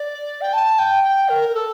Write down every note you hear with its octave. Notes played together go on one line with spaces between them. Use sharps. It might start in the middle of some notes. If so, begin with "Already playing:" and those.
Already playing: D5
G5
A5
G5
G5
A#4
A#4
A4